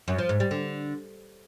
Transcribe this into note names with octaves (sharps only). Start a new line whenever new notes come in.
F#2
F3
G#2
G3
D3